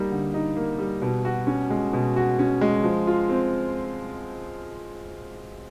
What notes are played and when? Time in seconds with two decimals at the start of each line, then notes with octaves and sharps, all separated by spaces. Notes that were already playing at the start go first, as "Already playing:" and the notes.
Already playing: G3 A#3 D#4
0.11 D3
0.34 D#4
0.57 A#3
0.78 G3
1.02 B2
1.25 F#4
1.47 C#4
1.70 G#3
1.93 B2
2.16 F#4
2.39 C#4
2.61 G#3
2.84 F3
3.07 F4
3.29 C4